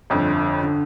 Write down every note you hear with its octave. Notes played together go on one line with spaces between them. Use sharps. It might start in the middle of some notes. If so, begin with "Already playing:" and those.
G1 F2 D3
D3